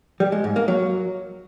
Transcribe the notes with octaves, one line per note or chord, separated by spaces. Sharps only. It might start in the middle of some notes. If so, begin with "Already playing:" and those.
G3
G#3
G#2
A#3
F#3